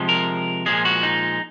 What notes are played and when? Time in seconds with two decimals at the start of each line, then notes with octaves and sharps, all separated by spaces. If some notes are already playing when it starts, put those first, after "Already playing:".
Already playing: C3 F3 G#3
0.09 A#4
0.66 A#2 F3 G#3 G#4
0.85 F#4
1.03 D#4